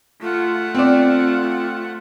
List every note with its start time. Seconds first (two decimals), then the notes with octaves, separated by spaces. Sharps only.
0.22 A3 F4 F#5
0.75 C4 F4 D5